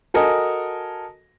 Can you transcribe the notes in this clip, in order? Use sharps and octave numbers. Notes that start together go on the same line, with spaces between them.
F#4 A4 A#4 D#5 G#5